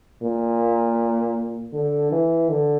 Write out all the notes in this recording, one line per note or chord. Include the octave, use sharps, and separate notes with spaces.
A#2
D3
E3
D3